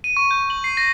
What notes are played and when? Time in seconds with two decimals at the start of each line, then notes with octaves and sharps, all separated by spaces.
0.04 D#7
0.17 C#6
0.31 G6
0.50 F#7
0.64 C7
0.77 A#6